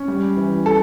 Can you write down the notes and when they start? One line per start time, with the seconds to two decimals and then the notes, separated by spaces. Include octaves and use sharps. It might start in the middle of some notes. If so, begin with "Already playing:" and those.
Already playing: C#4
0.08 G3
0.37 E3
0.66 A4